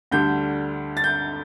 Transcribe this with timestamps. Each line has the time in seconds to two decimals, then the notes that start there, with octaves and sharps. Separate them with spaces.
0.11 D2 D3 G3 G6
0.97 A6
1.04 G6